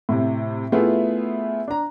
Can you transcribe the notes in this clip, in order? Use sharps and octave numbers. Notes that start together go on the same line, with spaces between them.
A2 C3
A3 B3 E4 F4 G#4
D4 A#5